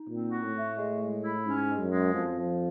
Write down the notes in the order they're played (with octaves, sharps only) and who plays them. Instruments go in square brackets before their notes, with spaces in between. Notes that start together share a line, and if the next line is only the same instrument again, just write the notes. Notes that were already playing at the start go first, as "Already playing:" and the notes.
Already playing: [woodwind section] D#4
[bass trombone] A#2 [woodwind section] C4
[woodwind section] F#4
[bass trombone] A2
[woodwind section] A3
G#3
G#3
E4
[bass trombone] G#2 [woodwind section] C#4
[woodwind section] G#3
[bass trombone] F#2
[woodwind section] G#3
[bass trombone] F2 [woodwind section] F3
[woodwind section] F3